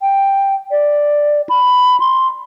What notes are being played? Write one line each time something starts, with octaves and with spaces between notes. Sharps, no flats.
G5
D5
B5
C6